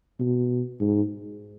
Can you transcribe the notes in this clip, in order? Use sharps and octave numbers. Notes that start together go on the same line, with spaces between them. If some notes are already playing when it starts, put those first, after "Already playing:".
B2
G#2